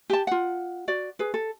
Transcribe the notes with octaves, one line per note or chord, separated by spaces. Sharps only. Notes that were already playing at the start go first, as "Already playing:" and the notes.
G4 A5
F4 F#5
F#4 D5
G#4 B4
A4